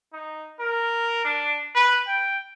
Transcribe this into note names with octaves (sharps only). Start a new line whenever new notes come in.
D#4
A#4
D4
B4
G5